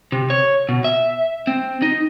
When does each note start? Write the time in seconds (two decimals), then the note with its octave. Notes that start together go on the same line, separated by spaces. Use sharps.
0.12 C3
0.30 C#5
0.69 B2
0.84 E5
1.47 C4
1.82 D#4